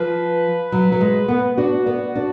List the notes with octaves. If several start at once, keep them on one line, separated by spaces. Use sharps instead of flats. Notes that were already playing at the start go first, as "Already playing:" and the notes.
Already playing: F3 B4
F#3
F#3
G#3
B3
D4 F#4
B3
D4